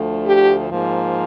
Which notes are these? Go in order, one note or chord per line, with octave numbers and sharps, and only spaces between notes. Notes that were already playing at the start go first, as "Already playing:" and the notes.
Already playing: D2 D3 F3 A3
G4
G#2 F3 A#3